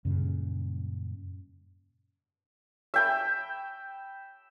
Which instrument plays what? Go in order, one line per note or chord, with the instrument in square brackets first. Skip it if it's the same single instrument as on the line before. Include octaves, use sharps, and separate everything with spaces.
[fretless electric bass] F#2 A#2 C#3 G3
[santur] E5 G5 B5